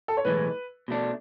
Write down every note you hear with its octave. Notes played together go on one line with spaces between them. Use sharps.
A4
C#5
B1 A2 E3 G#3 B4
B2 A3 D4